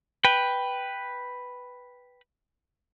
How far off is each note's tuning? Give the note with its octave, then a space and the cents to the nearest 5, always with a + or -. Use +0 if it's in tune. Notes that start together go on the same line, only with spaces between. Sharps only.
B4 +0 G5 +0